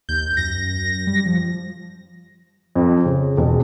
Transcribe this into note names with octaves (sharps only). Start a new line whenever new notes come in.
D#2 G6
F#2 A#6
G3
F3
F2
C#3
E1